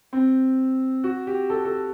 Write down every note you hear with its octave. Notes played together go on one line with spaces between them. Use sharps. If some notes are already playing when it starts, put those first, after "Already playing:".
C4
F#4
G4
A4
A4